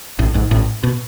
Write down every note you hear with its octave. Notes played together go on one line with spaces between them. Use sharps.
A1 A2
G#1 G#2
A1 A2
B2